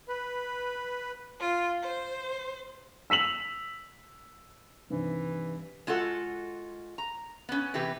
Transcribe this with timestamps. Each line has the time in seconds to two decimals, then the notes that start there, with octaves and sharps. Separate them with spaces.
0.08 B4
1.40 F4
1.81 C5
3.10 E6 B6 F7 F#7
4.90 G2 C3 D#3 E3
5.87 G#3 F4 F#4 A4 F#5
6.98 A#5
7.49 B3 C#4
7.74 C3 E3 G4 B4